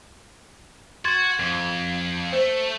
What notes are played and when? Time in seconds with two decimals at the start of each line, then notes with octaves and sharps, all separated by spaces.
1.05 F#4 C6 G#6 A6
1.39 F2
2.33 A3 C5